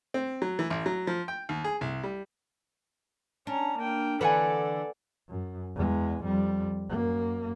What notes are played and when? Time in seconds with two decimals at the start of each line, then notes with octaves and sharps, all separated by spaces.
0.14 C4
0.42 F#3
0.59 E3
0.70 A1
0.86 F#3
1.07 F3
1.28 G5
1.49 D#2
1.64 G#4
1.81 C2
2.04 G3
3.47 C#4 D4 A#5
3.77 A#3 G5
4.21 D3 E3 A4 B4 D5 F#5 G#5
5.29 F#2
5.75 E2 G#3
6.23 F2 G3
6.89 F#2 A#3